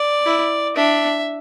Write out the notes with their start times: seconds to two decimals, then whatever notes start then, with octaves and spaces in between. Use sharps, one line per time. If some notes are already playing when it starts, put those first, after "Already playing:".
Already playing: D5
0.26 E4
0.76 D4 E5